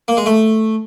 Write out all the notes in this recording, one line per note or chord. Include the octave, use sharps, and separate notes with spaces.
A#3
G#3
A3